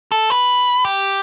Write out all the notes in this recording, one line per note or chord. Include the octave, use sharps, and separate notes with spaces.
A4
B4
G4